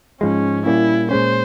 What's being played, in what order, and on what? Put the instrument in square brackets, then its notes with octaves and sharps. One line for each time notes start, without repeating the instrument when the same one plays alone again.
[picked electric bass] G#2 F3 G#3 [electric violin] C#4
[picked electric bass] A#2 G3 A#3 C#4 [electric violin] E4
[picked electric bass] A#2 G#3 C#4 [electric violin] C5